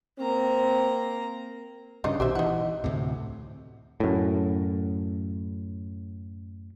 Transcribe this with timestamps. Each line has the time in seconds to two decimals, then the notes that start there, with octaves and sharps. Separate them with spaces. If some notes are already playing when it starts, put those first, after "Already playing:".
0.19 A#3 C4 A#5
2.04 G2 C#3 D4 D#4 D#5
2.20 A#1 B2 D#3 G4 C5 E5
2.35 E3 D#4 F#5
2.84 D2 A2 C3
4.00 F#2 A2